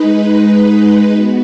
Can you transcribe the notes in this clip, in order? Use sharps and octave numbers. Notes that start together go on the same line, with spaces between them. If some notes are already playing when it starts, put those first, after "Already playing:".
Already playing: G#3 D#4 B4
B3 F#4